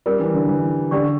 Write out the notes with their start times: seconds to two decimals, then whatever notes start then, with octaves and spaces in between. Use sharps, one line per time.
0.06 G3 C#4 F4 A#4
0.20 E3
0.34 D3
0.49 E3
0.91 D3 G4 D5 G5 C#6